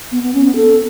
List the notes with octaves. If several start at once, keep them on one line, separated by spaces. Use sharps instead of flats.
B3
B3
C#4
B3
A4